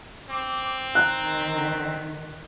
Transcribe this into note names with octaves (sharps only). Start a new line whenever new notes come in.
C4 D6
D#3 A#5 F#6